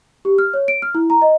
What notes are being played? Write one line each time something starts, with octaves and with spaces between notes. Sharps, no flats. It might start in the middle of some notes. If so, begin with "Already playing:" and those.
G4
F6
C#5
D7
F6
E4
A#5
D#5